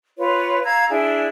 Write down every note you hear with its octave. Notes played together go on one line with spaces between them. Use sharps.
F4 B4 C#5
F5 A#5 E6 G#6
D4 E4 G#4